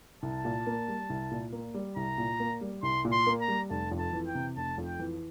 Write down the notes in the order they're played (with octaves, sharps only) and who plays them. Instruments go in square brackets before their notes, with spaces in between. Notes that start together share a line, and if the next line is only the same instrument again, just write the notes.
[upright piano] C2 [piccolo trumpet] A5
[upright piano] A#2
A#3
G3
C2
A#2
A#3
G3
[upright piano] C2 [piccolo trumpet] A#5
[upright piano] A#2
A#3
G3
[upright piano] C2 [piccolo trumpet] C6
[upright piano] A#2
[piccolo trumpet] C6
[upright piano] A#3
[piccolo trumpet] A#5
[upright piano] G3
[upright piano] F1 [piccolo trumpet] A5
[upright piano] F2
[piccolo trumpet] A5
[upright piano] E3
[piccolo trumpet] G5
[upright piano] C3
[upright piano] F1 [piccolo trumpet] A5
[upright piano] F2
[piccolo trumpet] G5
[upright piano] E3